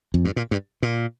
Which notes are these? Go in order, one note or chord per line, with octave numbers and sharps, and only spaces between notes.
F2
G2
A#2
G2
A#2